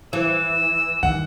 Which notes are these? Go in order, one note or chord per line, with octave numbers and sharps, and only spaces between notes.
E3 E6
D#3 F#5